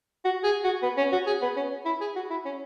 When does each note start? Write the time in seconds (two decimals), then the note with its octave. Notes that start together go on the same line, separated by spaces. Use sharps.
0.25 F#4
0.44 G#4
0.64 F#4
0.82 B3
0.97 C#4
1.12 F#4
1.27 G#4
1.42 B3
1.57 C#4
1.85 E4
2.01 G#4
2.16 F#4
2.30 E4
2.45 C#4